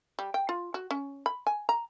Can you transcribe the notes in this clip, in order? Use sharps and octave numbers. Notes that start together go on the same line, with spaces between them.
G3
G5
F4
F#4
C#4
B5
G#5
A#5